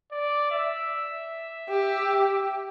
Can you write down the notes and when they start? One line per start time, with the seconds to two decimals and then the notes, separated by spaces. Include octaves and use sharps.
0.12 D5
0.51 E5
1.69 G4